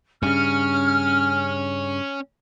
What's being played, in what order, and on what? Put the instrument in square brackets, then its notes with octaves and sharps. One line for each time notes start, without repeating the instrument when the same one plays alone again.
[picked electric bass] G2 C#3 [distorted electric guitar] C#4 [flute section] F6